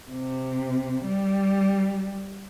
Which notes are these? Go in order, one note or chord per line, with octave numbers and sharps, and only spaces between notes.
C3
G3